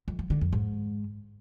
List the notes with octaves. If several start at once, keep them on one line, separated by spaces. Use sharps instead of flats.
F2
F3
D3
F2
G#2